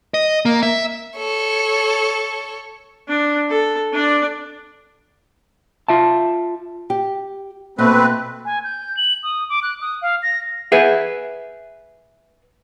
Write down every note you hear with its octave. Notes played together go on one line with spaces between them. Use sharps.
D#5
A#3
E5
A4 C#5
D4
A4
D4 D5
F4 E5 A5
G4
B2 A3 A#3 C4 B4
G#5
G6
F#7
D#6
D6
F#6
D#6
F5
A#6
G#4 B4 E5